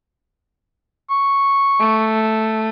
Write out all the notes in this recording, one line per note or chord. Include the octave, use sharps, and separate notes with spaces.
C#6
A3